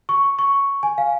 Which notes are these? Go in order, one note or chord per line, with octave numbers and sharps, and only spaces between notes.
C#6
C#6
G#5
F5